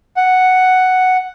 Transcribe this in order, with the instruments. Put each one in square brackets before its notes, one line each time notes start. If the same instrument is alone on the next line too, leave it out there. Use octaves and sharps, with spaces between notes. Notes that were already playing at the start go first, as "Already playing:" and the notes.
[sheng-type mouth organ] F#5